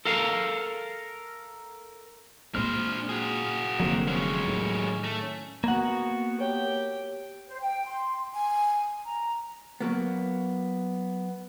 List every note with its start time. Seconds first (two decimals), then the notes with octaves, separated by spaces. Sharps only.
0.05 A4 A#4 F5
2.55 A#2 G#3 C4 D4 C5 F6
3.09 F#4 G#4
3.80 F1 F2 D3 F#3 A#3 C4
4.08 F#3 G#3 C#4 C#5
4.48 A2 D#3
5.04 A3
5.64 A#3 B3 F#4 F#5
6.40 G4 C#5 G5
7.48 C5
7.60 G5
7.86 C6
8.33 G#5
9.05 A#5
9.81 F#3 A#3 B3